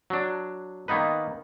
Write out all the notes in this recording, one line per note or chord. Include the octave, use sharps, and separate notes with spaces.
F#3 D4
D#3 A#3 B3 D#4 B4